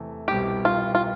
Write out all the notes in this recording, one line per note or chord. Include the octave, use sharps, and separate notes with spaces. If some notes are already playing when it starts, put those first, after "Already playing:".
Already playing: E2 C3 E3 A3
C2 B2 G3 C4 G4
F4
F4